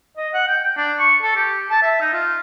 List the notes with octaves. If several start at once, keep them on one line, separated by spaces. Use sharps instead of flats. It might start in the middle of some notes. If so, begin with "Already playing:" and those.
D#5
F#5
G5
G5
D4
C#6
A4
G4
A5
E5
D#4
F4